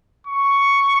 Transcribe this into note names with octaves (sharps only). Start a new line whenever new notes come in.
C#6